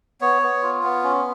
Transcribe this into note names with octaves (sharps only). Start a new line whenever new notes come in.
B3 C#5
B3
F4
B3
C#4